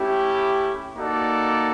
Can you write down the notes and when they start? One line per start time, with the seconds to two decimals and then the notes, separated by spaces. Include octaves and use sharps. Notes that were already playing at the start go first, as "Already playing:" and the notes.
Already playing: A3 C#4 E4 G4
0.97 A#3 D#4 F#4 A4 D5